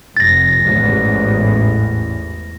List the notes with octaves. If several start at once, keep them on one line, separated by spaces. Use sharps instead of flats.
F1 A6 A#6
A1 E2 G#2